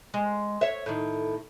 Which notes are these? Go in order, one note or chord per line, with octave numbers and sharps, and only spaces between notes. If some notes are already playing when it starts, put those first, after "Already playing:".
G#3
C#5 E5
A2 D#3